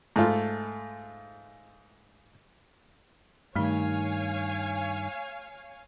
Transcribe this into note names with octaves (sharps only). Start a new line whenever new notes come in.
G#2 A3 F4
G2 D#3 A3 D#4 C#5 F5 G#5